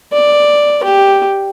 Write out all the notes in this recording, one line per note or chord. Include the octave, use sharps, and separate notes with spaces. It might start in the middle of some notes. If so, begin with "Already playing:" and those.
D5
G4